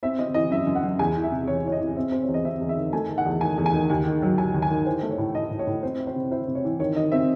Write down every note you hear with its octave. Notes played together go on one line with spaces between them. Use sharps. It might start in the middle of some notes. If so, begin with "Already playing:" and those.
C4 E5
C4 D#5
E3 D#5
F#2 E5
F#2
F#5
F#2
E2 G#5
E3
E5
C3
E2 C#5
E3 C#5
D#5
E3
C4 E5
C4 C5
C#5
E2
D#5
C4 E5
E2
E5
D#3
A3 G#5
D#3
F#5
E2
D#3 G#5
E2
G#5
D#3
D#2
D#3
F#3
F#3 G#5
D#2
G#5
D#3
E3 C5
A3
C#5
A2
A2 D#5
A2
C#5
A2
C4 C5
E4
C5
C3
E4 C5
C3
C#5
E3
D#3 C#5
D#3 D#5
C4 E5